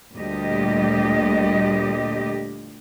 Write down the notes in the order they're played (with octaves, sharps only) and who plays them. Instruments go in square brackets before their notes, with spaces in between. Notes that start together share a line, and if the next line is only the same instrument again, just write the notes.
[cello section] D2 A#2 G3 G4 D#5